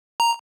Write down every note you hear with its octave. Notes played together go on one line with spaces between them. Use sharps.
A#5